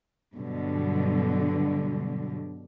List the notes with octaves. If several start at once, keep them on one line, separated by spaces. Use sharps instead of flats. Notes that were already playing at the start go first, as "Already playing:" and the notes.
G2 B2 D3 F#3